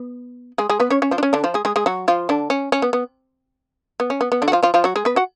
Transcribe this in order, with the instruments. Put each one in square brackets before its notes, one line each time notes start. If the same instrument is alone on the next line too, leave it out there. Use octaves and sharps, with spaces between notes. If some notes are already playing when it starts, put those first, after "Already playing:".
Already playing: [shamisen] B3
G#3 G#4
G#3 G#4
B3 B4
C#4 C#5
C#4 C#5
F3 F4
D4
C#4
D3 D4
F3 F4
G#3 G#4
G#3 G#4
G#3 G#4
F#3 F#4
F3 F4
D3 D4
C#4
C#4
B3
B3
B3
C#4
B3
B3
D3 D4
F#4
F3 F4
F3 F4
F3 F4
F#3 F#4
G#3 G#4
B3 B4
F#4 F#5